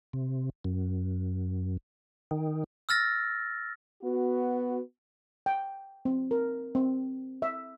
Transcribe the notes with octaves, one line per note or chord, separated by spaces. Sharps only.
C3
F#2
D#3
E6 F6 A6 A#6
B3 F#4
G5
C4
A#4
C4
E5